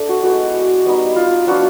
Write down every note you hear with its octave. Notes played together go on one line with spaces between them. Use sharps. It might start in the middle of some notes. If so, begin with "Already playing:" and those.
Already playing: A3 D4 A4
F#4
G#3 B3 E4 F#4
G3 B3 D#4
F4
F#3 B3 D4 F4 F#4